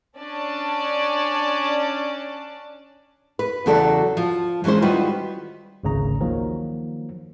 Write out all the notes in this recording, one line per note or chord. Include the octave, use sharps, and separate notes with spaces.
C#4 D4 D5 A5
B4
E2 C#3 F#3 F#4 A4 D5
F3
E3 F#3 G#3 C#4 C5
D#3 G3 F4 F#4 B4
G#1 D2 C#3 A#5
D#3 F3 F#3 A#3